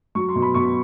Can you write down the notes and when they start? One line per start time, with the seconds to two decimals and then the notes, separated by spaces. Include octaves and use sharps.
0.15 F#3 C#6
0.28 C6
0.35 B2
0.42 B5
0.54 B2 C#6